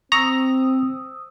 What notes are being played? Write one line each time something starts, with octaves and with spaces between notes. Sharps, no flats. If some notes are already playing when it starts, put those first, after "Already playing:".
C4 A#5 C#6 D#6 E6